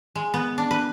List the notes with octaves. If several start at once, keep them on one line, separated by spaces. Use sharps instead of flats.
G#3
B3
D4
B4